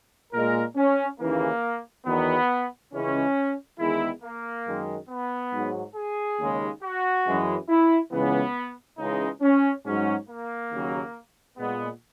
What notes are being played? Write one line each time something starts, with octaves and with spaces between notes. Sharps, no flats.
A#2 G#3 A#4
C#4
D#2 C#3 E3 A#3
E2 D#3 F#3 B3
C#2 C#3 E3 G#3 C#4
E2 D#3 G#3 E4
A#3
F#2 D#3 G#3
B3
G#2 F#3
G#4
D#2 C#3 G#3
F#4
F#2 E3 G#3
E4
C#2 C#3 E3 B3
C#2 C#3 E3 G#3 D#4
C#4
G#2 F#3 C#4
A#3
D#2 C#3 F#3
A#2 G#3 B3